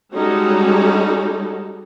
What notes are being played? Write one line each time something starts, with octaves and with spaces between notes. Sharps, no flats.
G3 G#3 C#4 D#4 F#4 A4